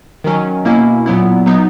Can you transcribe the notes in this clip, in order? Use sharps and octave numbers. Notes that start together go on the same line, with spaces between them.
D#3 F#3 C#4
B2 A#3 C#4 E4
A#2 F#3 B3 E4
F#3 B3 D#4